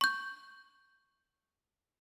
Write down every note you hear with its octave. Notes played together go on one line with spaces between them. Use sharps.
C#6 G6